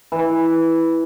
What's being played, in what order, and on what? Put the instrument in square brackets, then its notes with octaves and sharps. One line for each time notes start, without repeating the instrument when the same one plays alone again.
[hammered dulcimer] E3